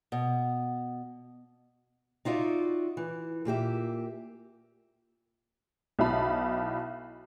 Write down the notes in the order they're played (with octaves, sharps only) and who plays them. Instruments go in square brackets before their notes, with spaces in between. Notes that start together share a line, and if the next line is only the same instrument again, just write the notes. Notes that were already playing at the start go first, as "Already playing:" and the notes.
[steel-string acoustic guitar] B2
D#4 F4 F#4 D5 E5
E3
A#2 A#3 G4 E5
[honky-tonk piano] B1 E4 A5 B5